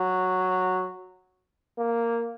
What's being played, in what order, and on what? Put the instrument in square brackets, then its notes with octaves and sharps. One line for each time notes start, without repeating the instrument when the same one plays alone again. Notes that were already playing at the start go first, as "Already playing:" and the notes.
Already playing: [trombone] F#3
A#3